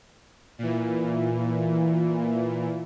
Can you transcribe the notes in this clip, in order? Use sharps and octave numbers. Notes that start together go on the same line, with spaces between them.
A#2 E3